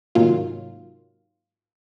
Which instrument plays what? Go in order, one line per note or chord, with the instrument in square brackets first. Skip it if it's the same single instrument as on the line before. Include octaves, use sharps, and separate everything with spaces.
[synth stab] G#2 C3 D#3 F#3 A#3 F4